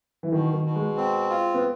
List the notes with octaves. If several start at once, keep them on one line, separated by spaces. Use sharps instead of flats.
E3
B2 D#3
D#3
B2
G#3
C4
F4
B3